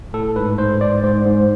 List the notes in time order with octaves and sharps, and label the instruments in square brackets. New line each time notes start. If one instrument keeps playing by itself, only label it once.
[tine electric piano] A2 A4
G#2 B4
G#2 C5
G#2 D5
G#2 C5
G#2